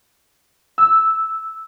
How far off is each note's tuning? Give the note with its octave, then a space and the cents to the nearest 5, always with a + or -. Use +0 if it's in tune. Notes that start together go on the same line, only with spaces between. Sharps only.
E6 -5